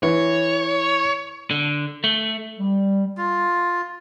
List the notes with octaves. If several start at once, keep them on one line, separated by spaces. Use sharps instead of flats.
E3 C#5
D3
A3
G3
F4